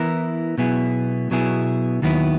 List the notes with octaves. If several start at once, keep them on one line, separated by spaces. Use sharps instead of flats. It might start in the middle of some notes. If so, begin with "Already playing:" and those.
Already playing: E3 B3 E4 A#4
B2 F#3 B3 E4 G#4
B2 F#3 B3 E4 G#4
D#2 D#3 F#3 B3 E4